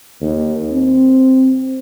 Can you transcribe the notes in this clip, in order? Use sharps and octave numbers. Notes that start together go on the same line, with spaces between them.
D#2
C4